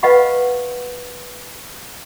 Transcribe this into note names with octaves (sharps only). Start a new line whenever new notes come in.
B4 D#5 F5 F#5 B5 C#6